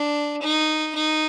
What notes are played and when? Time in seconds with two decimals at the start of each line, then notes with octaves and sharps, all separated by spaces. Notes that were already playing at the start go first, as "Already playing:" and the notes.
Already playing: D4
0.42 D#4
0.95 D#4